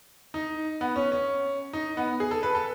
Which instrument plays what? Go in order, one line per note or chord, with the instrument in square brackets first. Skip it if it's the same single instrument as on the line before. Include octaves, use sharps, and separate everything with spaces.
[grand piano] D#4
B3
C#4
C#4
D#4
B3
G#4
A4
B4
A4